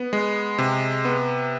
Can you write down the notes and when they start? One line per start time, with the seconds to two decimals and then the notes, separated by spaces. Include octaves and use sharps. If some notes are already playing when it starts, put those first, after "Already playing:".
Already playing: B3
0.13 G#3
0.58 C3
1.05 B3